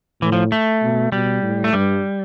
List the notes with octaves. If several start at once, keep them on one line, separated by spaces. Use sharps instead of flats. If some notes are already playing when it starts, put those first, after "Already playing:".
A2 E3
F3
A3
B2
B2 G3
A2
A3
G2 G3